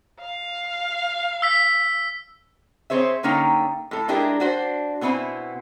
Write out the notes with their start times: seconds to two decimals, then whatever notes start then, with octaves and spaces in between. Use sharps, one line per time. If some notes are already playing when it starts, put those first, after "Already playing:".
0.21 F5
1.42 E6 B6
2.90 C4 G#4 C5 C#5 E5
3.23 D3 G3 A#3 C#4 D#4 G5
3.91 A2 A4
4.08 G#3 D4 E4 G4 G#4 A#4
4.40 D4 F#4 C5
5.01 B2 B3 C4 E4 G#5